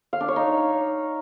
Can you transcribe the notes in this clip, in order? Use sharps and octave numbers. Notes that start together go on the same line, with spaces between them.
F5
D4
C#5
D#4